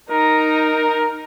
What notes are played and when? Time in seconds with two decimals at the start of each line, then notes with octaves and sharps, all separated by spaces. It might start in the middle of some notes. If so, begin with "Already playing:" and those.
0.11 D#4 A#4 A#5